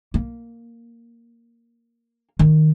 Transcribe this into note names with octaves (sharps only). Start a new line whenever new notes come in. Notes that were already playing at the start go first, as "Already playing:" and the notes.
A#3
D#3